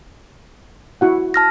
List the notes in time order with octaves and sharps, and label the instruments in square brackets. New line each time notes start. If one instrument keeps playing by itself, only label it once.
[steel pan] E4 F#4 F#5
[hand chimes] A5 F6 A#6